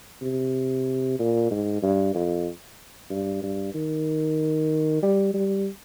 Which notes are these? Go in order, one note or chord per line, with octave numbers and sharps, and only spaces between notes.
C3
A#2
G#2
G2
F2
G2
G2
D#3
G3
G3